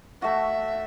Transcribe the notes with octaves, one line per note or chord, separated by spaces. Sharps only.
A3 F#4 E5